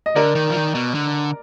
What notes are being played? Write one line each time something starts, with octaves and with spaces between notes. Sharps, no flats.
D#5
D3 A#4 D5
D#3
F3
D#3
B2
D3